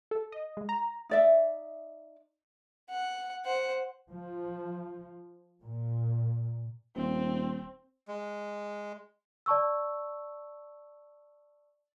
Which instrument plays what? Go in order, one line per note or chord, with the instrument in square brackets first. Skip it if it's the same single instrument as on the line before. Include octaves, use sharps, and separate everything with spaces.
[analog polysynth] A4
D#5
G#3
A#5
[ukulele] D#4 D5 E5
[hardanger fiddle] F#5
C5 F#5
[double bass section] F3
A#2
[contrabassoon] D#1 [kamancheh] C4
[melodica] G#3
[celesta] D5 A5 C#6 E6